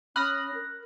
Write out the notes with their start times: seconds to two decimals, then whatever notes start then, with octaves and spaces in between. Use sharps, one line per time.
0.16 C#4 B5 D#6 F6 F#6 A#6
0.54 A#4